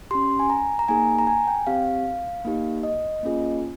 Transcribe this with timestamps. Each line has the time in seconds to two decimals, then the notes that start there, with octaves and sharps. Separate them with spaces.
0.11 C#4 G4 C6
0.39 G#5
0.50 A#5
0.79 A#5
0.88 A#3 D#4 G#4 G#5
1.19 A#5
1.27 G#5
1.47 G5
1.67 C4 G4 F5
2.45 A#3 D#4 G4
2.83 D#5
3.23 A#3 C#4 F4 G#4